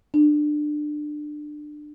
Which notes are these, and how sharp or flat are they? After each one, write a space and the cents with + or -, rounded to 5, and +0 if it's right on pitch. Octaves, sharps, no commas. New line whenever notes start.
D4 +25